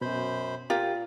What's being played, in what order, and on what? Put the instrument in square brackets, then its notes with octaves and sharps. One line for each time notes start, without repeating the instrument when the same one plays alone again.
[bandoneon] F#2 C5 B5 [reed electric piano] B2 G6
[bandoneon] A#2 [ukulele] F4 [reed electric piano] G4 A#4 F5